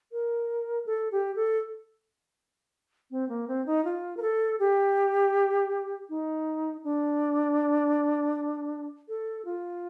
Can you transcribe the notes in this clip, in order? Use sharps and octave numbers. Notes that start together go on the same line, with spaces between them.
A#4
A4
G4
A4
C4
A#3
C4
D#4
F4
A#4
A4
G4
D#4
D4
A4
F4